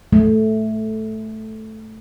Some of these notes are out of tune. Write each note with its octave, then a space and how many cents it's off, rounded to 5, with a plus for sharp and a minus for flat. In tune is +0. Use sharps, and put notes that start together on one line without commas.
A3 -10